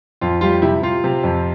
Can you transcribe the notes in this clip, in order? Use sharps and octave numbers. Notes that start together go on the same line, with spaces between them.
F2 F4
G3 F4
C3 E4
C3 F4
C3
F2